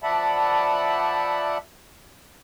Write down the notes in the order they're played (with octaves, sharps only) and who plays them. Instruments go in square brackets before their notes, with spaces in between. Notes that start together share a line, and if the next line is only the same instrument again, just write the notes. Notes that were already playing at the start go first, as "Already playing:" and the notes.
[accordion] F3 D5 E5 F#5 A5 B5